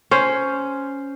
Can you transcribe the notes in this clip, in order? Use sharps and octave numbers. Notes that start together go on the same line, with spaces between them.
C#4 C5